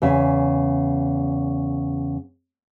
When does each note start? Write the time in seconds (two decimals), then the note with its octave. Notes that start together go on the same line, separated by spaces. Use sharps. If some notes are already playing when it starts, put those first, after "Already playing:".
0.02 E2 C#3 E5